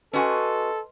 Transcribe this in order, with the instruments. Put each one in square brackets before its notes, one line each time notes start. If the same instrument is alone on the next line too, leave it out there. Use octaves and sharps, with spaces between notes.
[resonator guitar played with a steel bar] C#4 F#4 G#5 [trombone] A4 [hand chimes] B4 D#5 C6